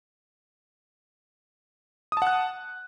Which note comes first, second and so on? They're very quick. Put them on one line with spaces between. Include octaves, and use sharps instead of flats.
D#6 A5 F#5 F#6